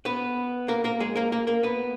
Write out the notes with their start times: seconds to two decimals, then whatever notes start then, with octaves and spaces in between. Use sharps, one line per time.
0.05 B3 B4
0.68 A#3 A#4
0.84 A#3 A#4
1.00 G#3 G#4
1.16 A#3 A#4
1.32 A#3 A#4
1.47 A#3 A#4
1.63 B3 B4